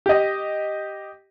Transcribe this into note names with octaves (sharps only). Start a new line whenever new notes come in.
G4 D#5